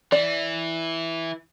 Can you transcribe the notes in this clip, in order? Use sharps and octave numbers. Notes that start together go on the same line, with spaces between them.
E3 D5